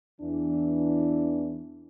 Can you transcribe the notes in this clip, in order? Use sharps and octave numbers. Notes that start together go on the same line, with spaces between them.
E2 E3 D4